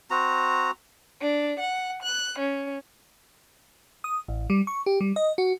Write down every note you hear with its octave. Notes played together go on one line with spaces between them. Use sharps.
C4 F#4 A#5
D4
F#5
F#6
C#4
D#6
A1
G3
C#6
G4
G3
D#5
F#4